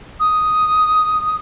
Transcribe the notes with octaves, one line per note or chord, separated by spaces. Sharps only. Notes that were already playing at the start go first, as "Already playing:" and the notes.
D#6